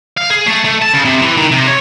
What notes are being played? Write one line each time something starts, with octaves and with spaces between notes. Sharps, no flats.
F5
G#4
A3
A3
A5
C#3
C3
E3
D#3
C3
C#5